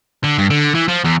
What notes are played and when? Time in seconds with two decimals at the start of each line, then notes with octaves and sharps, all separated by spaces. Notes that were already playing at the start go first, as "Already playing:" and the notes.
0.24 D3
0.38 G2
0.50 D3
0.74 E3
0.88 F3
1.04 E2